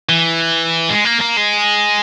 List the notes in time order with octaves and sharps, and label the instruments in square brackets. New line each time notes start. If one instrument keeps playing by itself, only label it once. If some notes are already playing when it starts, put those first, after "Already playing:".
[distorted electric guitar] E3
G#3
A#3
A#3
G#3